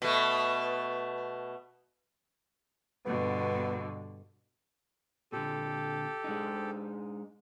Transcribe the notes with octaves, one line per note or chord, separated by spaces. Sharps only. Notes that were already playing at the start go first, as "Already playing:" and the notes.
B2 A3
G2 B2 D3 B3
A#2 D3 G4 A4
G#3 D4 D#4